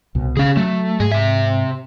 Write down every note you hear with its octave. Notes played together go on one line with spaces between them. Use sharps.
C2 B2
C#3 C#4 G#4 F5
F#3 A3
G#2 G#4
C3 E5